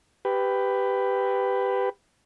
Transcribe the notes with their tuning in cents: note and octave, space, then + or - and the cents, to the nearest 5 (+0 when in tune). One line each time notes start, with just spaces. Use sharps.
G4 +0 B4 +10